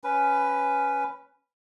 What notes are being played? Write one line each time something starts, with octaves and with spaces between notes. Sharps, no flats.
C#4 B4